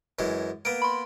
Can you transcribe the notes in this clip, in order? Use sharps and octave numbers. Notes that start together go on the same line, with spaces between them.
F#2 E3 G#3
A#3 B3 D7
B5 C6